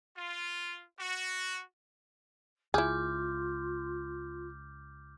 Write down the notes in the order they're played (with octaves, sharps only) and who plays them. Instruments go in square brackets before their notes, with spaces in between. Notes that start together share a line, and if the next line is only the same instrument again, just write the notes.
[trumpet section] F4
F#4
[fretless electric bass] C#2 [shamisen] E4 G#4 [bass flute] F4 [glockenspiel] D6 F6 G6